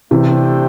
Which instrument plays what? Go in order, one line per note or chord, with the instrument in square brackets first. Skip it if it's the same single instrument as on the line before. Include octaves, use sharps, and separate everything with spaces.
[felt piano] C3 E3 [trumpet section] A3 D4 C5 E5 G5